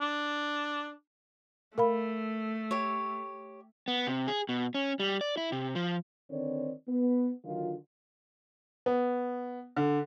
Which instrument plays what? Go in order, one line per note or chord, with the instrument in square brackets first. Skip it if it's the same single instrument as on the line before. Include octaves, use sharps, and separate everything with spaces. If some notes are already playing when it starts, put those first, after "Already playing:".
[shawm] D4
[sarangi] A3 [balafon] A#4 F5 B5
[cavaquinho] G4 C#5
[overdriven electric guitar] B3
C3
G#4
B2
C#4
G3
D5
E4
C3
F3
[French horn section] D3 D#3 C4 C#5 D5
B3
D3 D#3 F#3 F4
[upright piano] B3
D3